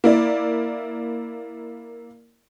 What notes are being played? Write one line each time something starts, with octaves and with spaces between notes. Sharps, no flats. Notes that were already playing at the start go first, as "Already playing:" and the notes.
A#3 E4 D5